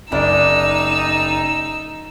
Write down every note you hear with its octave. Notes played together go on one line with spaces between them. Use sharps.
F#1 D4 D#4 D5 E6